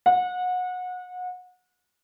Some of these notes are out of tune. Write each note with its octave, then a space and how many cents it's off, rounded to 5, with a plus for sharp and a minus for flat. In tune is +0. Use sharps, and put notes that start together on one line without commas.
F#5 -30